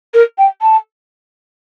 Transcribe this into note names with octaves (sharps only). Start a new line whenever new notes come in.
A#4
G5
A5